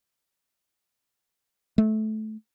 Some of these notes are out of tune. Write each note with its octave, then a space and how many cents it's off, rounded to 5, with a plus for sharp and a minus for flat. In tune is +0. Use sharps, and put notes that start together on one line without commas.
A3 -20